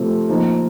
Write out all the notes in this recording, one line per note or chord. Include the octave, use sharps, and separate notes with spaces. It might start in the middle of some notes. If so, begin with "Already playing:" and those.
Already playing: C3 F3 A3
F3 A#3 D#4